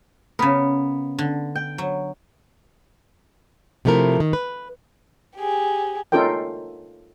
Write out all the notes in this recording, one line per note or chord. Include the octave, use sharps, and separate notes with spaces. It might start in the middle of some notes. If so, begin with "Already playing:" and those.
C#3 B3 A#4
D3
G5
F#3
C3 F3 A3 E4 A#4
D#3
B4
G4 G#4
C#4 D#4 F4 A4 A#4 G5